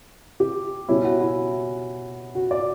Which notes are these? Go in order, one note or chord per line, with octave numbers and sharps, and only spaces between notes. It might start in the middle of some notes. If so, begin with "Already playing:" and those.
G4
B2 G3 C#4 E4
F#4
E4
F#4
D5